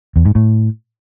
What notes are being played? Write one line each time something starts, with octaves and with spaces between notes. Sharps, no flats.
E2
G#2
A2